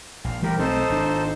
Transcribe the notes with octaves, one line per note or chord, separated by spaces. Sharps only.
A#1 F5
E3 G3 A3 G4 A#4
B1 A3 C4 D#4 A4 C5
G#1 D4